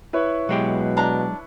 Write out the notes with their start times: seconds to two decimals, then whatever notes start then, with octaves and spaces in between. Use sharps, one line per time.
0.13 E4 B4 C#5
0.49 B2 F#3 G#3 G4
0.97 D4 A#5